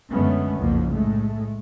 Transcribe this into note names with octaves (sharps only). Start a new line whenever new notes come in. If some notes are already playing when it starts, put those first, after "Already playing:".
F#2 D3 G#3 A3 B3 C#4
F#1 B1 F2 F3 A#3
A2 G#3 A3